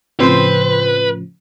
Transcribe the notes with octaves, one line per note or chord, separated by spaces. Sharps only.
A2 C#3 F3 C4 B4 C5